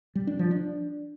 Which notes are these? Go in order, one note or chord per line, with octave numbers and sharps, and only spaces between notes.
G3
D4
F3
D4